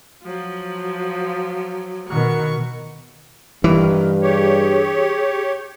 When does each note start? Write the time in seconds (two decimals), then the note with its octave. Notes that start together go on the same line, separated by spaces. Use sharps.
0.23 F3 F#3
2.10 B2 D#3 C#6
3.64 G2 D#3 E3
4.22 G4 G#4 C#5